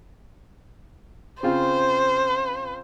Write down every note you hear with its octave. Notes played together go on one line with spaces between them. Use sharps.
C#3 C4 F4 C5